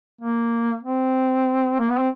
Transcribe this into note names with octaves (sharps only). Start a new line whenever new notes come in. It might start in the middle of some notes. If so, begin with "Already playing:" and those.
A#3
C4
A#3
B3
C4